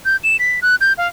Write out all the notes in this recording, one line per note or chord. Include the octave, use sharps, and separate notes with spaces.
G6
E7
B6
F#6
G6
F5